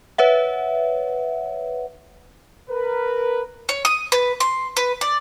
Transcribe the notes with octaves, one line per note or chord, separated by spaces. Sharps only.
B4 C#5 E5 F#5
A#4 B4
C#5
D#6
B4
C6
B4
D5